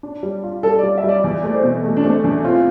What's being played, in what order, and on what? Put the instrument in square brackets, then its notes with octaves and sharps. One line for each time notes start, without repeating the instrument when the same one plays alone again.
[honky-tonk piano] D4
G3
F4
[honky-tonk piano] G3 [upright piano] A4
[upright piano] D5
[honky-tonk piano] G3
[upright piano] E5
[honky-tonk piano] G3 [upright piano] D5
[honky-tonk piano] E2 [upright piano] D5
[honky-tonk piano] A3 [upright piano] D5
[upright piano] C5
[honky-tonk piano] B2
A3
[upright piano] D4
[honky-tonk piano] A3 [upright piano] C4
[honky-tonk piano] E2 [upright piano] D4
[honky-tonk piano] C4 [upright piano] F4